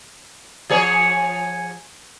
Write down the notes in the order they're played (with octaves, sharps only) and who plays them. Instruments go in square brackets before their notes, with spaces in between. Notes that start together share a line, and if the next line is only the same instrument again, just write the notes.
[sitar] F3 G#4 C#5